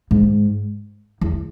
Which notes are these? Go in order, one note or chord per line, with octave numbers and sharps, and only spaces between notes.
G#2
E2